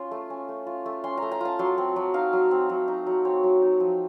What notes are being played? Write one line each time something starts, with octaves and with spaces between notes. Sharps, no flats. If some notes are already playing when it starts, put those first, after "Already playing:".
Already playing: C#4 F4 C6
A3
C#4
A3
F4
A3
C#4 C6
A#5
A3
A#5
F4 A5
F#3 C6
C4
F#3
D#4 F5
F#3
C4
F#3
D#4
F#3
C4 C#5
F#3
D#4
F3